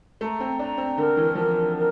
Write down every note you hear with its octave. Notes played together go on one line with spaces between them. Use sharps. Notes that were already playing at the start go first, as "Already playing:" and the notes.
A3 A#5
C4
D4 A#5
C4
D3 A#4
E3
F3 A#4
A#4